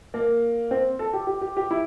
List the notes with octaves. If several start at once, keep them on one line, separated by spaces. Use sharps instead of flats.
A#3
C4
A4
G4
G4
G4
G4
E4